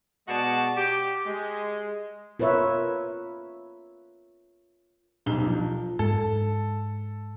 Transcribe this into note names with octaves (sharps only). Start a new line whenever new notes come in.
B2 G#3 F#4 D5 D#5 A5
G4
G#3
F4 A#4 B4 C#5 E5
D#1 B1 G7
F3
G#2 A4